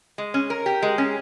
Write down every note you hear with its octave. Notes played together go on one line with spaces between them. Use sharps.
G#3
C#4
A#4
G4
G#3
C#4